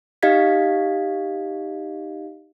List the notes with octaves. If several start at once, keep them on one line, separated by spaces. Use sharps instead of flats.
D#4 G4 D#5 F5 G#6 B6